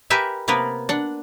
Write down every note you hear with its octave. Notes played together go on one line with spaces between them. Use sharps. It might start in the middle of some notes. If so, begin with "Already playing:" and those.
G4 A#4 B4 E5 G#5
C3 A#3 B3 A#4 B4
D4 F#5